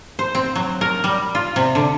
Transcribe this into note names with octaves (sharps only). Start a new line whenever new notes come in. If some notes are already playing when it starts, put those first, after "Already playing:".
C5
C4
F#3
A#4
G3
F4
C3
D3